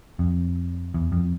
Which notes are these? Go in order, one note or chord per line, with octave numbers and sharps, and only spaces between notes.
F2
E2
F2